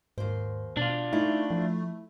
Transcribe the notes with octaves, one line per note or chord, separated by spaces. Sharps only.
D#2 G#2 C5
B2 D4 F4
A3 D#4 E4
F3